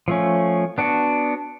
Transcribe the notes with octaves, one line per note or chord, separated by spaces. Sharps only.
F3 A3 C#4
B3 D4 F#4